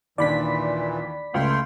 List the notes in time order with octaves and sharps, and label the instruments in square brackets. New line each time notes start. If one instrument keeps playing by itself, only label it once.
[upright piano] D#2 D4 [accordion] A#2 E3 [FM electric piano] D5 B5 B6
[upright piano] C#2 [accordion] A3 G5 C6